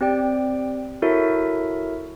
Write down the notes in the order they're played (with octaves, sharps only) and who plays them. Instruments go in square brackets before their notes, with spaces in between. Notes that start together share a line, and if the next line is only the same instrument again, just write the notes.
[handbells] C4 G4 D5 G5
E4 F#4 A4 A#4 C#5 E5